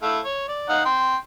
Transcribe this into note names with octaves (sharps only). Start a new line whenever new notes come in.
A3 E4 F5
C#5
D5
D#4 F5 F#5
G5 C6